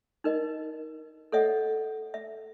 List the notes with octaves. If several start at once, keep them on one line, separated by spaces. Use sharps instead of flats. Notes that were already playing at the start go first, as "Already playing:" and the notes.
D#4 A#4 D#5
A4 C#5 D#5 E5 F#5
E5